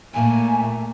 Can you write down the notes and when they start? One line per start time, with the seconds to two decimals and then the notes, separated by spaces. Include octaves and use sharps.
0.14 A#2 A3 A#3 G#5